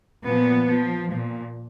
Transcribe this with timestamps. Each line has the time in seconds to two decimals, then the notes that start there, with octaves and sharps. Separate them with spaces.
0.25 A#2 F3 B3
0.67 F3
1.10 A#2 F3